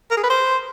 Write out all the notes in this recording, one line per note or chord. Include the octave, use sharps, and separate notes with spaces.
A#4
G#4
B4
C5